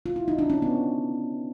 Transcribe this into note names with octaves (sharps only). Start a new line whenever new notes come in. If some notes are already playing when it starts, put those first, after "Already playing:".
F4
E4
D#4
D4
C#4
B3